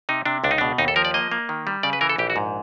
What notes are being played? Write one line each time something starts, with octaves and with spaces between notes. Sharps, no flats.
C3 D#4
C3 D4
C#2 D4
D#4
B2 D4
D#2 D#4
A4
F3 A#4
D5
A#3 D#5
A#3
D#3
G3
C#3 D5
B4
E3 A#4
A4
A#1 G4
F#4
G#2